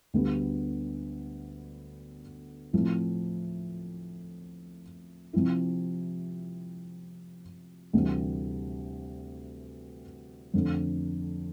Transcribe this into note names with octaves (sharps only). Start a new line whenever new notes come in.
D2 D3 G3 B3
A2 F3 C4 E4
C3 F3 C4 E4
D2 C3 E3 G3
F2 D3 A3